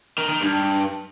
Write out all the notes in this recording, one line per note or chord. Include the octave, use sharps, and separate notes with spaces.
D#3
D#3
G2